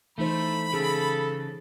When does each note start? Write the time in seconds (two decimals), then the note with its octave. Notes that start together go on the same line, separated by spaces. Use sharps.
0.18 E3 A3 D#4 C5 B5
0.74 C#3 G#4 A4